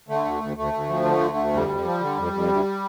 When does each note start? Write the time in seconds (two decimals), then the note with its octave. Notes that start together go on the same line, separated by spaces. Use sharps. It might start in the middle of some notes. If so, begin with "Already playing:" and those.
0.09 D3 A3
0.25 D2
0.41 D2
0.57 D2 A3
0.73 D2
0.89 F3
1.05 D3
1.21 D2
1.37 D2
1.53 F2 G3
1.69 F2
1.85 F3
2.01 D3
2.17 F2
2.33 F2
2.49 D2